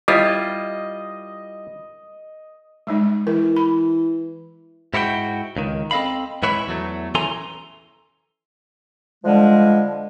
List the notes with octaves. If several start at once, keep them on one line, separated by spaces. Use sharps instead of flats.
G3 E4 F4 D#5
G3 G#3 D#4
E3 A#4
B5
G#2 E4 F#4 C#5 G5
C#2 D#3
C4 A4 D#5 F5 B5
G#2 E3 E4 B4 C#5 B5
E2 F#3 A3
E3 C#4 A4 G#5 A#5 C6
D3 F3 G3 G#3